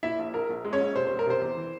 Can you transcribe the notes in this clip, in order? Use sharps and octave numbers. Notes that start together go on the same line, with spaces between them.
A#2 E4 E5
A#1
A#1 A#4
A#1
G#3
C#4 C#5
A#1
C3 C5
E1 C5
A#4
C3 C5
E2
E3